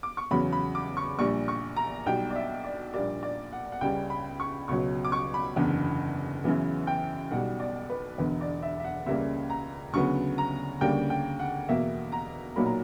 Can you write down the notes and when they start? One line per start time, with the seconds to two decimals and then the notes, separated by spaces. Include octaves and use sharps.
0.03 D6
0.17 C#6
0.31 E2 C#3 F#3 B5
0.52 B5
0.75 D6
0.97 C#6
1.19 A#1 A#2 G3 C#6
1.48 C#6
1.76 A#5
2.06 B1 B2 G3 G5
2.30 D5
2.35 E5
2.64 D5
2.94 A#1 A#2 G3 A#3 D5
3.23 D5
3.52 F#5
3.72 F#5
3.81 C#2 C#3 G3 G5
4.10 B5
4.40 C#6
4.68 C#2 B2 F#3 C#6
5.05 D6
5.12 C#6
5.34 B5
5.56 F#1 E2 D3
6.44 F#2 C#3 E3 B3
6.87 G5
7.31 B1 B2 G3 F#5
7.60 D5
7.90 B4
8.18 E1 E2 D3 B4
8.41 D5
8.63 E5
8.80 E5
8.84 F#5
9.06 C#2 C#3 G3 A#3 E5
9.50 A#5
9.93 D2 C#3 F#3 B3 C#6
10.38 A#5
10.81 D2 C#3 G3 A#3 G5
11.10 G5
11.39 F#5
11.69 E2 B2 A#3 E5
12.12 A#5
12.56 B1 A#2 F#3 A#3 B5
12.66 A#5